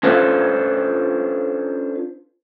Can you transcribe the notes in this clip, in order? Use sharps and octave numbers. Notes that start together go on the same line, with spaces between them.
C#4 D4 F4 A4 B4 C5